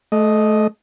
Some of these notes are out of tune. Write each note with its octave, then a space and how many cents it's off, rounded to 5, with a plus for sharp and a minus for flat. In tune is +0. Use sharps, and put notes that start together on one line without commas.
A3 -25 D#5 +0